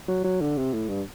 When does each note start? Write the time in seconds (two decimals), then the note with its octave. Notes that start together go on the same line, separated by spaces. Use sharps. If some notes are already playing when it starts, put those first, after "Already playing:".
0.08 F#3
0.24 F#3
0.41 D3
0.58 C3
0.73 A2
0.89 G2